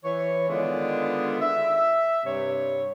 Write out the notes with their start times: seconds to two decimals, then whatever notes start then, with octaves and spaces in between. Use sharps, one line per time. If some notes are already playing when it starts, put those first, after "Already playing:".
0.05 E3 C#5
0.49 D3 D#3 G#3 B3 D4 F4
1.41 E5
2.24 G2 C3 C#5